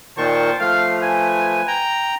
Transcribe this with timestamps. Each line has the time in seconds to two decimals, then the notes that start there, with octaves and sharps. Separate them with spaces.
0.18 A#2 D#3 C5 G5 A5 C#6
0.60 F3 A3 F5
1.01 B4 G#5
1.68 G5 A#5